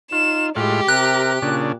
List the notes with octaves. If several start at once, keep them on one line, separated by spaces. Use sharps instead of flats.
D#4 F4 E7
A2 G#3 F4 G4
C3 A#4 F#6
A#2 C#3 D4